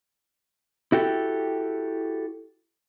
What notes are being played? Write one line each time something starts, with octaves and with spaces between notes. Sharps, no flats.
E4 F#4 G4 A4